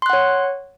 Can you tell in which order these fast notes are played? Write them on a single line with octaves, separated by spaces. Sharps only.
C6 F#6 F#5 C#5